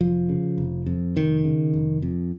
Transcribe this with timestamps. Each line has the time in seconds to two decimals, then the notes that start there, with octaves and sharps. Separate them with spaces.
0.01 F1 F3
0.29 C#3
0.58 F1
0.86 F2
1.16 F1 D#3
1.44 C#3
1.73 F1
2.02 F2